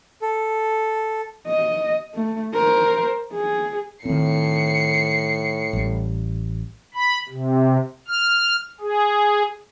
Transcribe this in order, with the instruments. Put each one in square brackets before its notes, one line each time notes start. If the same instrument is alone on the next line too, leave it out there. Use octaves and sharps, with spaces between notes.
[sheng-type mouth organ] A4
[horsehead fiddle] D#5
A3
A#4 C5
G#4
[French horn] A2 [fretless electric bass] D#3 C4 [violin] C7 C#7
[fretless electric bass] A1 G3
[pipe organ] B5
C3
F6
G#4